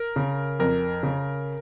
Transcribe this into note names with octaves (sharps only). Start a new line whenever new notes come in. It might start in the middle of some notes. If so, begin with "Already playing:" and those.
Already playing: A#4
C#3
F2 A#4
C#3